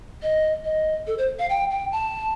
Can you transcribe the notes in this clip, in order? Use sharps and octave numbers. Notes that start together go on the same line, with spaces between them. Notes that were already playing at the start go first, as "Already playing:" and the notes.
D#5
D#5
A4
C5
F5
G5
G5
A5